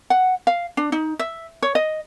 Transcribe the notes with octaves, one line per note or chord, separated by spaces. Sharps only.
F#5
F5
D4
D#4
E5
C#5
D#5